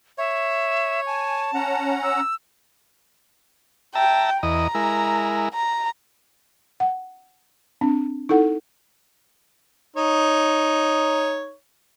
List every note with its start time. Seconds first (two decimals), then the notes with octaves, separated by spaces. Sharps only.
0.18 C#5 E5
1.07 G#5 A5
1.54 C#4 F#5 A#5
2.02 E6
3.95 E5 G5 A5 A#5
4.43 E2 D#5 A#5
4.75 G#3 E4 A#4
5.54 A#5
6.80 F#5
7.81 C4 D4
8.29 D#4 E4 A4 F#5
9.96 D#4 C#5